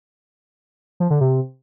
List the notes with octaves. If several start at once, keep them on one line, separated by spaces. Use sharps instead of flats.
F3
D3
C3